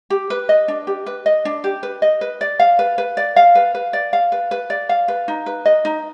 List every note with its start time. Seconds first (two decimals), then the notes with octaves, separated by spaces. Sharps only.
0.10 G4
0.30 B4
0.49 D#5
0.68 D4
0.87 G4
1.06 B4
1.26 D#5
1.45 D4
1.64 G4
1.83 B4
2.02 D#5
2.21 B4
2.41 D5
2.60 F5
2.79 B4
2.98 B4
3.17 D5
3.36 F5
3.55 B4
3.75 B4
3.93 D5
4.13 F5
4.32 B4
4.51 B4
4.70 D5
4.89 F5
5.08 B4
5.28 D#4
5.46 B4
5.66 D#5
5.85 D#4